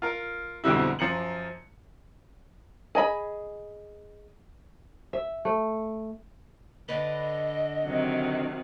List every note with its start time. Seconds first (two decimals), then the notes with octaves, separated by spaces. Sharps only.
0.02 F4 A#4
0.64 F2 G#2 B2 D3 G3 E4
0.99 F#2 F3 A#5 C#7 F#7
2.95 G#4 D#5 B5
5.13 E5
5.45 A3
6.89 D3 B4 D#5
7.85 C3 D#3 F#3